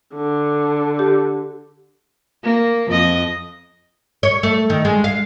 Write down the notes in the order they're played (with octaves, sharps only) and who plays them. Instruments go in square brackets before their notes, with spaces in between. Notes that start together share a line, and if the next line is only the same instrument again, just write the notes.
[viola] D3
[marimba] G4
[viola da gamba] A#3
F2 F3 D#5
[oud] C#5
A3
D#3
G#3
F5